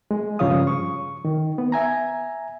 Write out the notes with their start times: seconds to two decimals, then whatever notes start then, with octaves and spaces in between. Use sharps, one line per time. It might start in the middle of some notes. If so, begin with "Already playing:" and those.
0.11 G#3
0.39 G2 C#3 F3 C#5 F5 D#6
0.67 C#6
1.25 D#3
1.58 B3
1.72 E5 G#5 A#5